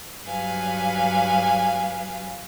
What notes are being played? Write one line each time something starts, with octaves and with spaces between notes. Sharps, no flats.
G2 F#3 B4 F5 G#5